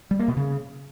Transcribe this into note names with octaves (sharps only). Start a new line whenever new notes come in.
G3
A#3
B2
C#3